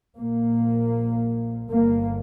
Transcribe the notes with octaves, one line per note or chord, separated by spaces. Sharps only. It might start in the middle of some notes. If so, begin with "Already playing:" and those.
A#1 A#2 A#3
G1 G2 A#3